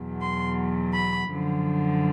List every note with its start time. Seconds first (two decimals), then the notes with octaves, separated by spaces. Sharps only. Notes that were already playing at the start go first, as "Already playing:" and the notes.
Already playing: E2 B2 F#3
0.20 C6
0.93 B5
1.30 F#2 D3 F3